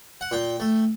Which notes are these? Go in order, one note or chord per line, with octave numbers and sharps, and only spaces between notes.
F#5
A#2 G5
A3